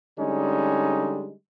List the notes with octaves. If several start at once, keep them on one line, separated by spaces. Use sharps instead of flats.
D3 G3 G#3 C#4 D#4